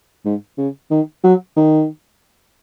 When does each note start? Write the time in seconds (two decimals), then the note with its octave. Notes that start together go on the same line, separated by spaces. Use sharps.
0.25 G#2
0.58 C#3
0.91 D#3
1.24 F#3
1.56 D#3